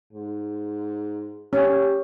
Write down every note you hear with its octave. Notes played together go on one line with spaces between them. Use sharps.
G#2
C#4 G4